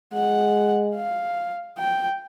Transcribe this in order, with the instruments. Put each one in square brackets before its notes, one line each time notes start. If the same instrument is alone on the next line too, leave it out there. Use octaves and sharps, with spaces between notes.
[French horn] G#3 [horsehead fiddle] F#5
[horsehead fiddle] F5
G5